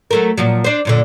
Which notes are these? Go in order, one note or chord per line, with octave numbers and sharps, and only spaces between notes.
F#3 A3 A#4
A#2 F3 F#3
D4 C5
F#2 A#2 D3